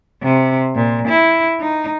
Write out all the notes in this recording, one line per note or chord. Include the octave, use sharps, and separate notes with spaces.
C3
A#2
E4
D#4